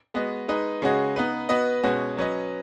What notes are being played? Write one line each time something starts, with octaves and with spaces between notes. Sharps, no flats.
G#3 B3 F#4 D#5
G#3 D#4 B4 D#5
C#3 G#3 C#4 F#4 D#5
B3 D#4 B4
B3 F#4 B4 D#5
B2 G#3 C#4 F#4
F#3 C#4 B4 D#5